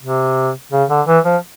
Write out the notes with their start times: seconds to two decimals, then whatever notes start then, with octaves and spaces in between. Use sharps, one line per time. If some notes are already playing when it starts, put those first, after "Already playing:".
0.03 C3
0.72 C#3
0.89 D3
1.07 E3
1.25 F3